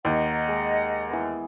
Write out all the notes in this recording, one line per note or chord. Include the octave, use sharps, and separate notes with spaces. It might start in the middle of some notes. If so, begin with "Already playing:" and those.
D#2 D#4 D#5 F#5 A#5
G#3
E3 B3